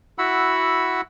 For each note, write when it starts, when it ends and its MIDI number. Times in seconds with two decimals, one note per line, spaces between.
0.18 1.01 64
0.18 1.01 66
0.18 1.01 78
0.18 1.01 83
0.18 1.01 88